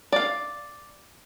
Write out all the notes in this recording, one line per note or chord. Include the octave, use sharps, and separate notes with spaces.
D5 F5